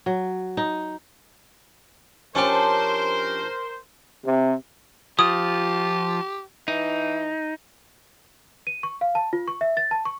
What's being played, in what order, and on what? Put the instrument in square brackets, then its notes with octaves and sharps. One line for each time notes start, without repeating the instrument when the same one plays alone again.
[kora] F#3
D#4
[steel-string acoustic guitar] F3 D4 A5 [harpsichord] C#4 G4 [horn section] A#4 C5
[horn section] C3
[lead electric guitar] F3 F4 [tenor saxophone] G4 [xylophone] D#6
[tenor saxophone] E3 [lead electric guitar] D#4
[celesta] D#7
C#6
F5
A5
F4
C#6
E5
A6
A5
C#6